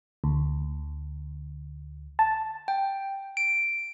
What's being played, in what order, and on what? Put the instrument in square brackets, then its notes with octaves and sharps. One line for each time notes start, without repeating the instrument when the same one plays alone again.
[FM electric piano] D2
A5
[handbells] G5
D7